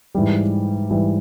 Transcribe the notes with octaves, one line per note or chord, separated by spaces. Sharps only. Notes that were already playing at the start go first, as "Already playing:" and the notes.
G#2 E3 G3
G#2 E3 G3